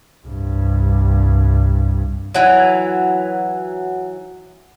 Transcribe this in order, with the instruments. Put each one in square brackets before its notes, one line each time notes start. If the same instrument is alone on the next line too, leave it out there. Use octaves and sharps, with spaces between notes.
[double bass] C2 G2
[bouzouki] E3 F#3